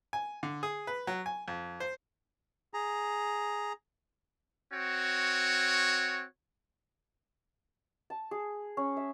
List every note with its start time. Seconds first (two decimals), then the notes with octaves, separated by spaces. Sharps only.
0.13 G#5
0.43 D3
0.63 G#4
0.87 B4
1.07 F#3
1.26 G#5
1.48 F2
1.80 C5
2.74 G#4 A#5
4.72 C4 F#4 C#5
8.10 A5
8.31 G#4
8.77 C#4
8.97 E5